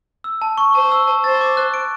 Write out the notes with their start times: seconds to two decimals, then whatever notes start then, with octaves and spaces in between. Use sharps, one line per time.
0.24 E6
0.42 A5
0.58 C#6
0.75 C5 A5
0.92 E6
1.07 A5
1.24 C5 A6
1.41 D6
1.57 F#6
1.74 D7